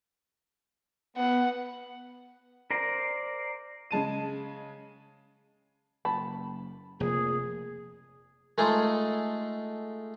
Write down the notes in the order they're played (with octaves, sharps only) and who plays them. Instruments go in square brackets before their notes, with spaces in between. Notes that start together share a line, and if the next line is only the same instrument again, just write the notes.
[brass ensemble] B3 [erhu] F#5
[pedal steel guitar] A#4 C5 D5 A#5
[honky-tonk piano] C#3 G#3 A5 D#7
[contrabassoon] F#1 [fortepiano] A5 B5
[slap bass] F1 [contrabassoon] A#2 [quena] G#4
[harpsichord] G#3 A3 D#4 F4 G#4 A4